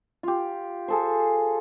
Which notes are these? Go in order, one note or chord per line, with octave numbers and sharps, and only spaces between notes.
F4 G4
G#4 A4 C5